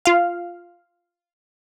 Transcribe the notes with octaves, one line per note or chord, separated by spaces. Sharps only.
F4 F5